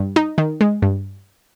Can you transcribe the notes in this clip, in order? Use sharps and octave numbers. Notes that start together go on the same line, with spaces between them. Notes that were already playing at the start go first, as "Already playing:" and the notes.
Already playing: G2
D#4
D#3
G#3
G2